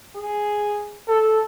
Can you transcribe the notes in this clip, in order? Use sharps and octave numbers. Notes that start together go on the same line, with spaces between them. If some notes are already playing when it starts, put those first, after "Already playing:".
G#4
A4